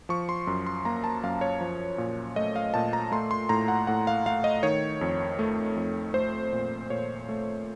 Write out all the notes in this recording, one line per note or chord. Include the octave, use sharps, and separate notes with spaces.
F3 C#6
C6
F#2
C6
A#3 A#5
A5
F#2 F5
C#5
F3
A#2
A3 D#5
F5
A#2 A5
A#5
A3 C6
C6
A2 A#5
F#5
A2 F#5
F5
A3 F5
D#5
D#3 C#5
F2
A3
F2
A3 C5
A#2
A#2 C#5
A3